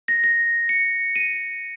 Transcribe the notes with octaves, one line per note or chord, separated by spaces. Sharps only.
A#6
A#6
C#7
D#7